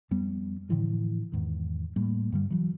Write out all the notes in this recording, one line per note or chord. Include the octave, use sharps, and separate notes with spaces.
F2 G3 B3
A2 D3 E3 F3
E2 G#2 D#3
A2 G3 A#3
G2 D3 G3
E3 F#3